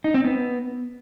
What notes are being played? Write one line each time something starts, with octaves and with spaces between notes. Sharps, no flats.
D#4
C4
B3